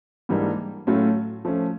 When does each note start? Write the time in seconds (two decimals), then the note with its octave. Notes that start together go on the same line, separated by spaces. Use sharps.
0.29 G#2 E3 G3 A#3 D4
0.87 A2 F#3 A3 C#4 F4
1.45 F3 A3 C#4